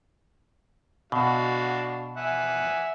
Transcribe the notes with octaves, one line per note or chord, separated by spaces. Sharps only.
B2 D4 F#4 F5
E5 F#5 G#5